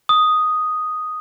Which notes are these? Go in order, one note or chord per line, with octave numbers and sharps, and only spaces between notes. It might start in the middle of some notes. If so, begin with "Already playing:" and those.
D#6